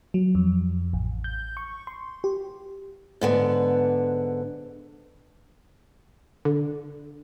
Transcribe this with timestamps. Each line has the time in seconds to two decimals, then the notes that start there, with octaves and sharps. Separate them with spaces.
0.14 F#3
0.35 F2
0.93 A1
1.24 G6
1.57 C#6
1.87 C6
2.24 G4
3.21 G#2 D3 B3
6.45 D3